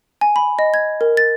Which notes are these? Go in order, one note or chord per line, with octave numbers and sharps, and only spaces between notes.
G#5
B5
D#5
G#6
A#4
A6